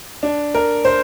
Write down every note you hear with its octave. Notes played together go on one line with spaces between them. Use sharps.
D4
A#4
C5